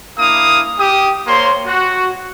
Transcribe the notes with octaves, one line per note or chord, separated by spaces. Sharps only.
A#3 D4 E4 F5 D#6
G4 D#6
A#3 C5 C#5 C6
F#4